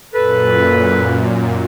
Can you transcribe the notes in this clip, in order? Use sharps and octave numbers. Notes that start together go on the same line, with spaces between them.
F#2 A#2 A4 B4